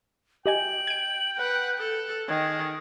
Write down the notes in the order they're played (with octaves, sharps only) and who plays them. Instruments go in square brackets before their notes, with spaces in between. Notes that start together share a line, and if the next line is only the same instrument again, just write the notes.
[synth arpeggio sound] G4 D#5 G#5 [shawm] G5 [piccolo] F#7
[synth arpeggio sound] G#6 D7
[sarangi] B4 [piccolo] F#5
[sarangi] A4 [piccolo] F#6
[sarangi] D#3 [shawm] G#4